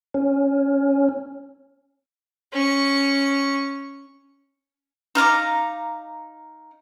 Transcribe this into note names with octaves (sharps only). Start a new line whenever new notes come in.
C#4
C#4 C#6
D#4 F5 A#5 D6